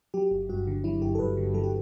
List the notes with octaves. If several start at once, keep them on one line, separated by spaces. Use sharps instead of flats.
F#3 G4
G1
G2 F#4
D3
F#3 E4
G1 G4
A4
G2 B4
D3
F#3 A4
G4